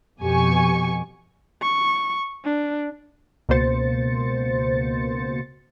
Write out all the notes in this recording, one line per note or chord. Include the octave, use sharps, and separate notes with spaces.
F2 B2 G4 G#5 C#6
C#6
D4
C#2 B2 A#3 C5 A6 C#7